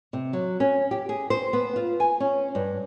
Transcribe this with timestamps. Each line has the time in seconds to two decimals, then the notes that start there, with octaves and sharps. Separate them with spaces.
0.13 C3
0.33 F#3
0.60 C#4
0.91 G4
1.09 G#4
1.30 C5
1.53 B3
1.76 F4
2.00 G#5
2.20 C#4
2.55 G2